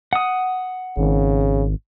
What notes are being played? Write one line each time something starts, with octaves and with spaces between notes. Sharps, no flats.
F#5 D#6
G#1 C#3